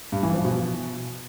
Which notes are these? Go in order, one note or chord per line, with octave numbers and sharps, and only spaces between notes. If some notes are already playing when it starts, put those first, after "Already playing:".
G2
E3
F3
B2